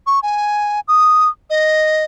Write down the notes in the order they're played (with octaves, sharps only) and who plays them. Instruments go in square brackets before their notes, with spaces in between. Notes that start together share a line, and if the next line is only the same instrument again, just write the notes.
[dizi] C#6
G#5
D#6
D#5